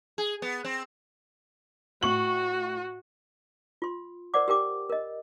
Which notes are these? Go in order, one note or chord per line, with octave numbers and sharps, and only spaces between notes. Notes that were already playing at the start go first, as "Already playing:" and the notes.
G#4
B3
C4
A2 F#4 C#6 F#7
F4 C6
A#4 C5 D5 F#5 D6
G4 A#4 G5 D6
A#4 D#5